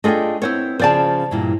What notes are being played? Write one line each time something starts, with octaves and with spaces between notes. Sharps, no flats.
A3 D4 F4 G#4 D#5 G5
B3 C4 E4 C5 C#5
C#3 F3 C5 D5 A5
G2 A#2 E3